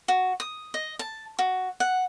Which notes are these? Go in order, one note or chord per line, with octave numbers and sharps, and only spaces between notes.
F#4
D#6
D#5
A5
F#4
F#5